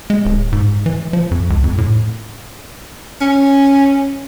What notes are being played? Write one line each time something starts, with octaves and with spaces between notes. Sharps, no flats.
G#3
D1
G#2
E3
F3
F2
C#2
F2
A2
C#4